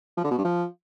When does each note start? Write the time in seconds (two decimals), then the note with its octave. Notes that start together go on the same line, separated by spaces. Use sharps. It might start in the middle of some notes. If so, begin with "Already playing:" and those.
0.17 F3
0.24 D3
0.31 B2
0.38 G2
0.44 F3